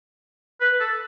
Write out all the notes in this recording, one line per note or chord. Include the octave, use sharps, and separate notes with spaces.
B4
A4